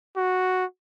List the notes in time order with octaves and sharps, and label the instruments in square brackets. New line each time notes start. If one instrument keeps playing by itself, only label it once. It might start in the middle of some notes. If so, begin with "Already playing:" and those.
[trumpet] F#4